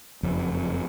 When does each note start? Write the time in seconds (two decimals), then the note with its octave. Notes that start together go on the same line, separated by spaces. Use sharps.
0.23 F#1 F2 C4